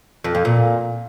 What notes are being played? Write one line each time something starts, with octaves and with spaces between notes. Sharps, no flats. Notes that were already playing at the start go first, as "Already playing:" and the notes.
F2
F2
A#2